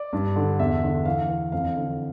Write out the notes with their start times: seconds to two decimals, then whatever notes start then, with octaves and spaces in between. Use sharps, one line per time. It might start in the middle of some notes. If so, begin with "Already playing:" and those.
Already playing: D5
0.13 G2
0.36 D3
0.59 E2 E5
0.82 D3
1.05 E3 F5
1.29 E3
1.52 F2 F5
1.76 D3